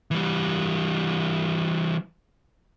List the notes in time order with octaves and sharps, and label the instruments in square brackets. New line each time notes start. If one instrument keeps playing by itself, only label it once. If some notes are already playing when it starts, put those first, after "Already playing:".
[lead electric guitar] E3 G3